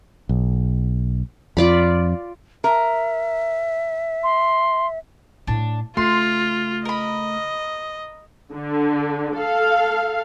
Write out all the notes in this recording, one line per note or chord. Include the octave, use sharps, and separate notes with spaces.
B1
F2 F4 D5 B5
A#4 E5
C6
A2 A3 D4
C#3 A3 F4 C6
A#4 D#5 B5
D3
A4 F5